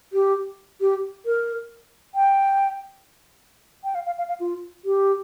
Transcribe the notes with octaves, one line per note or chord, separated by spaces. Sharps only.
G4
G4
A#4
G5
G5
F5
F5
F5
F5
F4
G4